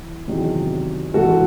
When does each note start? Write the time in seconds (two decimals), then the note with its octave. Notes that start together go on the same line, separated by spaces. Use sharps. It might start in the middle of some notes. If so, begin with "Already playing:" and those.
Already playing: E3 E4
0.28 E2 C3 D#3 F#3
1.14 G#2 E3 F#4 A4